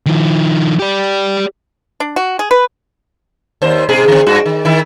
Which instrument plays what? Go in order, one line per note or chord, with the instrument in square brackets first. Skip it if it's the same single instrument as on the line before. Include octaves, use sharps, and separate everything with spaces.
[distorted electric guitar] D#3 F3
G4 D5
[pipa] D4
F#4
G#4
B4
[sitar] D#2 C5
G#2 B2 G#4
D3 C4
G2 F#4
D#3
D#3 E4